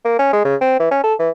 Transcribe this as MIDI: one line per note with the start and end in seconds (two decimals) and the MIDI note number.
0.05 0.16 58
0.19 0.31 61
0.33 0.42 56
0.45 0.56 49
0.61 0.79 60
0.80 0.91 52
0.91 1.03 61
1.04 1.14 69
1.19 1.30 52